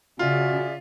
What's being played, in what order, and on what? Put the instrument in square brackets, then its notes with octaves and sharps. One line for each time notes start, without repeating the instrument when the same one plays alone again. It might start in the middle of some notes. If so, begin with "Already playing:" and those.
[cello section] C#3 [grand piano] F4 [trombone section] F#4 [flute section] D5 E5 G#5